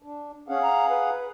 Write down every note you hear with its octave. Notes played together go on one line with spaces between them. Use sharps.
D4
C#4 G#4 F5 F#5
A#5
B4